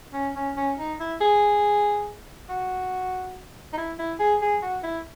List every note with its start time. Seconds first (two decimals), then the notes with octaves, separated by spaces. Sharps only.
0.13 C#4
0.36 C#4
0.57 C#4
0.79 D#4
1.00 E4
1.21 G#4
2.49 F#4
3.73 D#4
3.78 E4
3.99 E4
4.20 G#4
4.42 G#4
4.63 F#4
4.83 E4